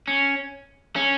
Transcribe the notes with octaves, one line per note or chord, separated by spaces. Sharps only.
C#4
C#4